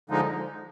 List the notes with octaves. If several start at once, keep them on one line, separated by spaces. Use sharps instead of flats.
D3 F3 G#3 D#4